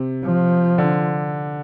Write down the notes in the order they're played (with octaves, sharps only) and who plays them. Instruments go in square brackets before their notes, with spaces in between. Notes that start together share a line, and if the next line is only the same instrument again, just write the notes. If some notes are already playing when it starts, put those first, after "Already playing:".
Already playing: [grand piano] C3
[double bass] F3
[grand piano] D3